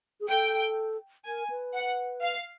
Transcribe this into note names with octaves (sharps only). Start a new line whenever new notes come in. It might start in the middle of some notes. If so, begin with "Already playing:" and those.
G#4
A4 G5
A#4 G#5
B4
F#5
F5